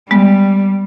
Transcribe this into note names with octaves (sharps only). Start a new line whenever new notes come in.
G3 G#3 B3